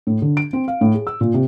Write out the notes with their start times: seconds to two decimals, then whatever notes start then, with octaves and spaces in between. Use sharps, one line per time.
0.07 A2
0.22 D3
0.37 D7
0.53 C4
0.68 F5
0.81 A2
0.94 G#4
1.07 E6
1.21 A#2
1.34 C3